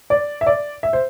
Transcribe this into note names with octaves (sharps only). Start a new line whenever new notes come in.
D5
E5
D5
E5
C5